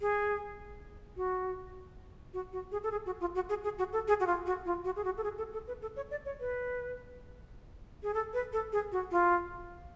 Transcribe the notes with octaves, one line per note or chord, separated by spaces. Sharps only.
G#4
F#4
F#4
F#4
G#4
A4
G#4
F#4
F4
F#4
G#4
G#4
F#4
A4
G#4
F#4
F4
F#4
F4
F#4
G#4
F#4
A4
G#4
A4
A4
B4
A4
C#5
D5
C#5
B4
G#4
A4
B4
A4
G#4
F#4
F4